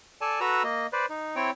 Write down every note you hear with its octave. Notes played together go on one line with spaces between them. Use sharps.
A4 D5 G#5 A5
F#4 A4 B4 A#5 E6
A#3 D#5
B4 C5 D5
D#4
C4 E4 C#5 G5